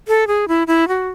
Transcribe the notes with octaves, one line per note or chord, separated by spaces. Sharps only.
A4
G#4
E4
E4
F#4